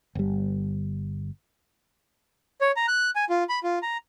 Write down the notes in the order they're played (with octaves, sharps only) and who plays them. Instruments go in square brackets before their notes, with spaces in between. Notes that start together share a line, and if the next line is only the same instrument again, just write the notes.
[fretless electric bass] G1 G3
[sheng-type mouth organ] C#5
A#5
F#6
G#5
F4
B5
F4
A#5